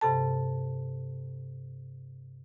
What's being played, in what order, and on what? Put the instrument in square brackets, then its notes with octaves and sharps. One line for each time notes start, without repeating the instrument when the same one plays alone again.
[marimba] G2 C3 A4 A5